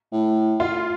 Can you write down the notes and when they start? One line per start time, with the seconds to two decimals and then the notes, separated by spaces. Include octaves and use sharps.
0.13 A2
0.60 F4